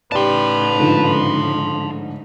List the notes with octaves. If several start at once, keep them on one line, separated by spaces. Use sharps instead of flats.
A2 C#3 D#4 G4 B4 D5 A5 C6
G#2 D3 F3